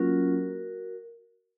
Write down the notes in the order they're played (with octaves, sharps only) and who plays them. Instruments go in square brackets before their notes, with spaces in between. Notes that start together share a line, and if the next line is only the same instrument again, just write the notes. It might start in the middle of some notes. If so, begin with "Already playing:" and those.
Already playing: [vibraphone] F#3 A#3 C#4 F4 F#4 A#4